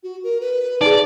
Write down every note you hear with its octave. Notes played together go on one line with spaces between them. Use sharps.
F#4
A#4
B4
D#4 G#4 D5